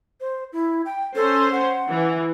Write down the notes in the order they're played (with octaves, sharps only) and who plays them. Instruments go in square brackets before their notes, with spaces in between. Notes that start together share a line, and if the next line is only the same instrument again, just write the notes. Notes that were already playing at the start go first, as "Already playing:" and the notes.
[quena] C5
E4
G5
[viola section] C#4 C5 [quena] A4
[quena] F#5
[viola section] E3